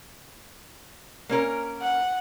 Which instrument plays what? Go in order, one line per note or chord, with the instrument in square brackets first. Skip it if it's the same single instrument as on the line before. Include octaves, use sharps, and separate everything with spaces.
[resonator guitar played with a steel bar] A#3 C#4 A#4
[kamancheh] F#5